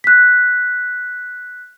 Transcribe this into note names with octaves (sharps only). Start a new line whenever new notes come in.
F#6 B6